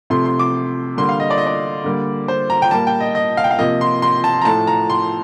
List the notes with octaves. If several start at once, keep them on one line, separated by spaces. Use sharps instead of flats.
C3 F3 A3 C6
C6
D6
D3 G3 A#3 C6
F5
D#5
D5
D#5
D5
D3 G3 A#3
C5
A#5
G5
A#2 G3 A#3 A5
G5
D#5
D#5
F5
G5
F5
C3 F3 A#3 D#5
C6
C6
A5
A#5
A2 F3 A3 A5
A#5
C6